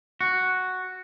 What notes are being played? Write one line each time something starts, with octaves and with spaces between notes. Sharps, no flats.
F#4